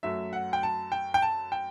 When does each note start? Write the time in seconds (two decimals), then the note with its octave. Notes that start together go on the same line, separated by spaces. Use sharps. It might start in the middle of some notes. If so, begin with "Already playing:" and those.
0.03 F#2 F#3 A3 E5
0.33 F#5
0.53 G5
0.63 A5
0.92 G5
1.14 G5
1.22 A5
1.52 G5